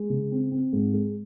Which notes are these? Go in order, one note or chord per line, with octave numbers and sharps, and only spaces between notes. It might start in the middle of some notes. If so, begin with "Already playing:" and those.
Already playing: G#3
C#3
C4
C4
G#2
G#3